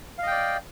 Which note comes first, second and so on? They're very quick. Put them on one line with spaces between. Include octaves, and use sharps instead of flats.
F5 D#5 G5 D5